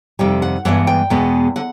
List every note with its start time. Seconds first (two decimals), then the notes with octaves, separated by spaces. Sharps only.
0.19 F2 C3 D#3 G3 G5
0.42 F#5
0.65 G2 E3 G#3 B3 F#5
0.87 G5
1.10 E2 B2 G#3 B3
1.56 D3 F#5